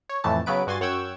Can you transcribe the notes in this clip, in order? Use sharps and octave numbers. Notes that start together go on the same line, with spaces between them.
C#5
F2 A2 E3 A3 A5
C#3 F#3 B3 B4 D7
G2 F#4 G#5 C6 A6
F#2 C#5 F#5 G5 E6 G#6